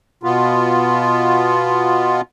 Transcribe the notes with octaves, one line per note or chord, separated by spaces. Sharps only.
B2 B3 F4